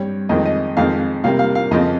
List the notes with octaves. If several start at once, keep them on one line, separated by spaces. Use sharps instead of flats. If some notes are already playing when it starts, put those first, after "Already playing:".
Already playing: G2 G3 C4 C#5
F2 D#3 G#3 C4 D#5
D#5
F2 D#3 G#3 C4 F5
C3 G3 A#3 F5
F5
F5
F2 C#3 F3 C4 D#5